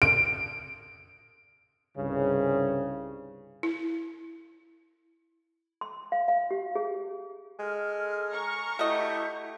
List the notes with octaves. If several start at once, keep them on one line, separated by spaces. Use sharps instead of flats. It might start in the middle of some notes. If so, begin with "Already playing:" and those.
D7
C2 G2 C#3
E4
C6
F5
F5
G4
G#4
G#3 A4 F6
A#5 C#6
A3 E4 F#4 G4 D#5